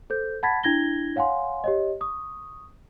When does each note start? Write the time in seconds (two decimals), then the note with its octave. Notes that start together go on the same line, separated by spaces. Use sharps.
0.10 A4 C5 G6
0.43 F#5 A5 B5 G#6 A6 B6
0.63 D4 E4 G#6 A#6 G7
1.16 C#5 F5 F#5 G#5 C6
1.64 G4 C#5 D#5
2.01 C#6 D#6